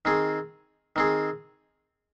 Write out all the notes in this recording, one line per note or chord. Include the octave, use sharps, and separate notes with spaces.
D#3 C4 G#4
D#3 C4 G#4